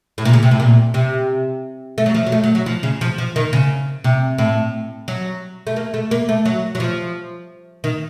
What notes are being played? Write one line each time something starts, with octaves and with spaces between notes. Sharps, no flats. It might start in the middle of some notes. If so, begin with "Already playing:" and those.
A2
A#2
C#3
C3
A2
A#2
C3
A3
F#3
F3
F#3
A3
F#3
F#3
F3
C#3
F3
F3
D#3
C#3
C3
A2
F#3
A3
A#3
A3
A#3
A3
F#3
F#3
F3
D#3